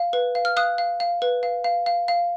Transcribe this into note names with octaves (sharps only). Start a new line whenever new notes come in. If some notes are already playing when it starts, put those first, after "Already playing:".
Already playing: F5
B4
F5
F6
F5 D#6 F#6
F5
F5
B4
F5
F5
F5
F5